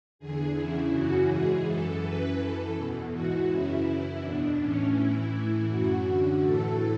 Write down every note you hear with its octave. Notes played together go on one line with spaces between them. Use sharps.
E2 D3 G#4
E2 C#3 E3 E4
F#2 C#3 E3 F#4
G#2 E3 G#4
F#2 E3 A4
F#2 E3 B4
F#2 E3 A4
E2 B2
G#2 E3 F#4
F#2 C#3 E3 E4
F#2 E3
E2 B2 D4
A2 E3 C#4
A2 E3 E4
A2 E3
F#2 E3 F#4
F#2 D3
A2 E3 A4